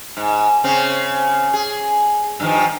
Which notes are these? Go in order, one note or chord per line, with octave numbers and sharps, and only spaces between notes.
G#2
C#3 C4
G#4
G2 D#3 F3